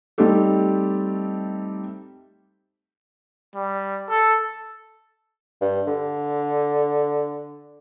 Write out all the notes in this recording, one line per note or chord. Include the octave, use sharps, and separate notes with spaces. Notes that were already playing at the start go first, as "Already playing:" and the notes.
G3 A3 C4 D#4 G4 A4
G3
A4
G2
D3